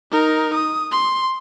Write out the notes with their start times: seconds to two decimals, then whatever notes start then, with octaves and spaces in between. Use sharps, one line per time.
0.12 D#4 A#4
0.55 D#6
0.92 C6